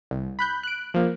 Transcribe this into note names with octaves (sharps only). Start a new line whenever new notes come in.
C2
B5 F#6 G6
F#6 D7
F3 A#3